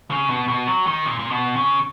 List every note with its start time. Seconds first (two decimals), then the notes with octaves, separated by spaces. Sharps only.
0.10 C#3
0.30 B2
0.48 B2
0.68 F#3
0.87 D#3
1.05 A#2
1.19 A#2
1.31 B2
1.56 C#3